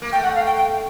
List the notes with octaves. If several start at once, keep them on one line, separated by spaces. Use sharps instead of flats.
A#3
A3 G5
F#5
F5
G5
G5